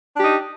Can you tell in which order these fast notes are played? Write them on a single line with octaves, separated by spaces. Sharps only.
D4 G4 D#4